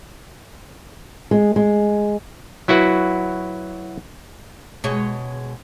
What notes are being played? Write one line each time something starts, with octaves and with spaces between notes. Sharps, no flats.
G#3
G#3
F#3 E4 F#4 B4
B2 G#3 C#5